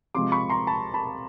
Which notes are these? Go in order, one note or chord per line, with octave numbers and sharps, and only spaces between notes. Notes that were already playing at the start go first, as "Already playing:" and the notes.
C3 F3 G#3 C6 D6
B5 C#6
A#5 C6
A5 B5
A5 B5